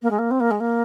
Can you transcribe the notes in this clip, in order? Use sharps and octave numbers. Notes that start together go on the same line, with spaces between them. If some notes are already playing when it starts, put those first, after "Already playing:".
A#3
G#3
A#3
C4
A#3
G#3
A#3